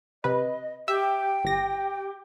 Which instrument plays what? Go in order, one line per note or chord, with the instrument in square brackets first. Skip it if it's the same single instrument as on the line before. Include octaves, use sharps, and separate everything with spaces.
[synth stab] C3 B4 [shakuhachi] D#5
[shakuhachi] G4 [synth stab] E5 [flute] G5
[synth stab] G1 A#6 [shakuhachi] G4